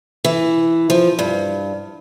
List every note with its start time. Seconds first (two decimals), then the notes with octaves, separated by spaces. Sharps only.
0.24 E3
0.90 F3
1.19 G2